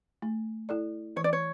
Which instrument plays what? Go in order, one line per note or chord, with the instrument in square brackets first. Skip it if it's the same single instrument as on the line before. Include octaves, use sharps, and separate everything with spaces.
[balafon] A3
E4 A4 D5
[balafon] E3 [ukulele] C#5
[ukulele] D5
C#5